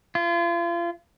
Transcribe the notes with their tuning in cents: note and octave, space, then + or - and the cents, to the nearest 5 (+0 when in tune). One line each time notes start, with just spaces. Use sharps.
F4 -35